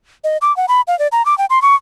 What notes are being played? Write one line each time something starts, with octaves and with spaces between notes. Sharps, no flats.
D#5
D6
F#5
B5
F5
D5
A#5
D6
G5
C6
C#6